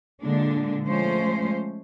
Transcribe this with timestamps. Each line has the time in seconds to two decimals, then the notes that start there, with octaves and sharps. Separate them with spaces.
0.21 A#2 D3 G#3 D4
0.85 F3 G#3 A3 C#4 C5